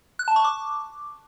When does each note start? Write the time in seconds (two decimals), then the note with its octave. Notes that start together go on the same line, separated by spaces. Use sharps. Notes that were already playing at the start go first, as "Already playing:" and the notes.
0.19 F#6
0.28 A5
0.36 C#6
0.44 D6